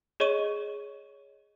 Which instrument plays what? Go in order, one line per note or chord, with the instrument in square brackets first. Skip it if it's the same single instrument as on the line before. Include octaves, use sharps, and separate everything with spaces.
[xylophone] G#4 C#5 D#5 C#6 D#7